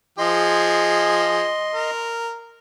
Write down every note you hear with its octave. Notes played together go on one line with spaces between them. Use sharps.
F3 G#4 D#5 C6
A#4